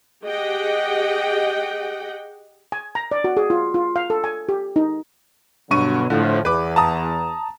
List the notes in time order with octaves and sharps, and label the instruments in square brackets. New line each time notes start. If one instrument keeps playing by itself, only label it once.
[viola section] G4 G#4 D#5 F#5 G5
[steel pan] G#5
A#5
D5
F#4
G#4
F4
F4
F5
A4
G#5
G4
D#4
[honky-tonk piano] G2 C#6 D#7 [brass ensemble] B2 D3 F#3
[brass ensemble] A2 F3 [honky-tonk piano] D3
[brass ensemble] E2 [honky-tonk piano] B4 D6
[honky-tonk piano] A5 A#5 D#6